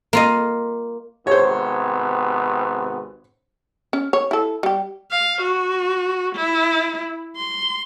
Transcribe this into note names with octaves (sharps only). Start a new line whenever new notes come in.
A#3 F4 D#5
G#1 C3 B3 C5 C#5
C#4
C#5
E4 A4
G3 G4
F5
F#4
E4
C6